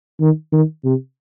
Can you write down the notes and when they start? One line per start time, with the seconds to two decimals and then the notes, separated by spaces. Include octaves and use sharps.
0.21 D#3
0.53 D#3
0.84 C3